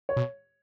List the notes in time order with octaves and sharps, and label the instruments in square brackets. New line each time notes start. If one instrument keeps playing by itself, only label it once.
[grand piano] C#5
[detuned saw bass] B2